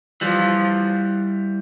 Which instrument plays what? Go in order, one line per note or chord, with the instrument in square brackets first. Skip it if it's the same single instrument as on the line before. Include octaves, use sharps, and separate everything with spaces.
[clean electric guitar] E3 G3 [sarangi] F3